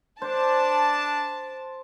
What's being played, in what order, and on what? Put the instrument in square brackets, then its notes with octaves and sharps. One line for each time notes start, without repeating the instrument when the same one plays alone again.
[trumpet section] D4 [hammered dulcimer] C5 [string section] A5